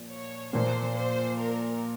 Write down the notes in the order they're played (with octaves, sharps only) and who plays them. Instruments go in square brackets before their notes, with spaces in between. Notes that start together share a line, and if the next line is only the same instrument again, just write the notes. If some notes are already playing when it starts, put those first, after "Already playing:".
Already playing: [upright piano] A#2 F3
[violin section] C#5
[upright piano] A#2 F3 A#3 [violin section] C5
[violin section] C5
A#4